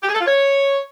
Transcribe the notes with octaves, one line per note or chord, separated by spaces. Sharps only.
G4
G#4
A4
F4
C#5